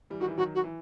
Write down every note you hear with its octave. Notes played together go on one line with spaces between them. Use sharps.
E3 G3
D#3 F#4
E3
D#3 F#3 F#4
F#4
E3